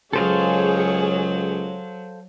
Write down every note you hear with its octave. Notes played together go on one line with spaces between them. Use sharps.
C#2 F#3 G#4 A4 C5 C#5 F5